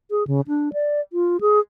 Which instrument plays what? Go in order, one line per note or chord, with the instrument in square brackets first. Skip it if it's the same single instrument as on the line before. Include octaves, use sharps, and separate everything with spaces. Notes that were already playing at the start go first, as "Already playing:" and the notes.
[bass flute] G#4
C#3
D4
D5
F4
G#4